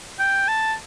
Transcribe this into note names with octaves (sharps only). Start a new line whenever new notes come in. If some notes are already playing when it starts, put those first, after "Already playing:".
G5
A5